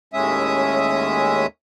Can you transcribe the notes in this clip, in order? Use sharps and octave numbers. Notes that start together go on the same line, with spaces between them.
D#2 A2 G#3 C#4 E5 D#6